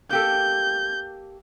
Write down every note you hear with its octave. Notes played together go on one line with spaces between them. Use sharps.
A#3 G4 A4 G6